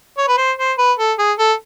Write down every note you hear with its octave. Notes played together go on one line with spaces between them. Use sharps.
C#5
B4
C5
C5
B4
A4
G#4
A4